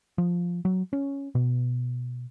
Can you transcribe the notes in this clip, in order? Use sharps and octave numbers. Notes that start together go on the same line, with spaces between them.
F3
F#3
C#4
B2